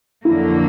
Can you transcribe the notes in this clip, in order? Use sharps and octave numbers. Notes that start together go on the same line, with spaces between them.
F2 D3 F#3 A#3 E4